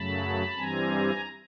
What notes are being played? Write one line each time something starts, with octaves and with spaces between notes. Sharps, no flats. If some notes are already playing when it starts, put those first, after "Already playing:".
Already playing: F#2 C#3 F#3 A3 A5 B5
G2 E3 G3 C4 G#5 A#5